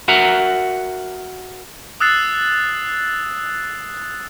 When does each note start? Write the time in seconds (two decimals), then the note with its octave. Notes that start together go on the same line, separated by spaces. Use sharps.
0.08 F#4 A#4 E5 F#5 A#5
2.00 D#6 E6 F#6 A6 C7 E7